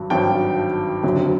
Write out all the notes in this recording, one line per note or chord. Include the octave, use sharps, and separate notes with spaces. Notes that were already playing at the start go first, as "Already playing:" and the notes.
Already playing: G#1 G2 F#3
G#1 G2 D#3 F#3 G5 A5
F#1 F2 D3 F#3